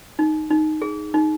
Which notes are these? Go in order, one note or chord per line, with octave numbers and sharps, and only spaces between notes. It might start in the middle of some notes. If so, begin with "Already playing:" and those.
D#4
D#4
G#4
D#4